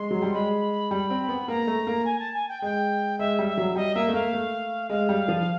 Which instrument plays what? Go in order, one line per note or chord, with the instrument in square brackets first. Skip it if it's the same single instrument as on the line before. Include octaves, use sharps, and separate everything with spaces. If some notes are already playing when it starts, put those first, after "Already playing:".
Already playing: [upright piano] G#3 [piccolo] C6
[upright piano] F#3
G3
[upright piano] G#3 [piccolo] B5
[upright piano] G3
C4
B3
[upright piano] A#3 [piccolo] A#5
[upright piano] A3
A#3
[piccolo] G#5
A5
G#5
G5
[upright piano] G#3 [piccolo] G5
[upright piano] G#3 [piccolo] E5
[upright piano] G3
[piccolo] E5
[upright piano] F#3
[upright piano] G3 [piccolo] D#5
[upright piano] A#3 [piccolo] E5
[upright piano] A3
[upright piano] A#3 [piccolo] F5
[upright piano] A3
[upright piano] G#3 [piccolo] F5
[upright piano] G3
F3